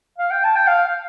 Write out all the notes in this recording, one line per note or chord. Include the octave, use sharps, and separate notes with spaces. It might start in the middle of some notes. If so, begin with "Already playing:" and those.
F5
G5
A5
G5
F5